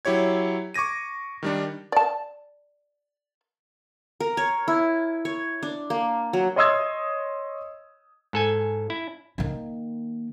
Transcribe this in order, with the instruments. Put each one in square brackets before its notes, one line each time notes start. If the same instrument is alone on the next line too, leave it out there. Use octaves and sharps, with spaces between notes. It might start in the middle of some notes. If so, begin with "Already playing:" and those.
[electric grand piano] F#3 E4 G4 C#5 G#6
C#6 D6 G#6 A#6 D#7
D#3 G3 D4
[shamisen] D5 A5
[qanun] A#4
C#5
E4
C#5
D4
A#3
F#3
[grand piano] C#5 D#5 C6 D#6 E6 G#6
[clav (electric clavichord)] G#2 A4 G#5
E4
[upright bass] D#3 A#3